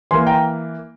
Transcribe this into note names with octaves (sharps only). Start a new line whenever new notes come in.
E3 A#3 G#5 C6
G5 A#5